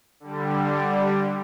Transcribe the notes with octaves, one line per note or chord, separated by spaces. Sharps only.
D3 G3